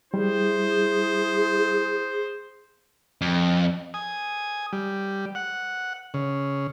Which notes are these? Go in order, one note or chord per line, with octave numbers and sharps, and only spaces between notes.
G3 E4 G#4 C5
F2
G#5 D#6
G3
F#5
C#3